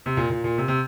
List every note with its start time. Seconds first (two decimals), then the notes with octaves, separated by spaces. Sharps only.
0.06 C3
0.17 A#2
0.30 A#2
0.44 A#2
0.58 C3
0.68 C3